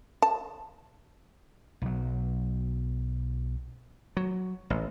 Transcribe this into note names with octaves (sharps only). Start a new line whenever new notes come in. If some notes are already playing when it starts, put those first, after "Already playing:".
A5
B1 F#3
F#3
A1